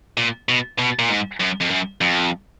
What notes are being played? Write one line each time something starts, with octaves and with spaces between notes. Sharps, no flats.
A#2
B2
B2
A#2
G#2
F#2
F2
F#2
F2